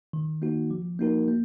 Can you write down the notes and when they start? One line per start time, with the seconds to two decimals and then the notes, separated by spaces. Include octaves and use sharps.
0.13 D#3
0.42 A#3 D#4 F#4
0.71 F3
0.99 A#3 D#4 F#4 A#4
1.28 A#3